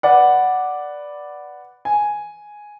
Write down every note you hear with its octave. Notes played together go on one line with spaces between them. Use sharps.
B4 D5 F#5
G#5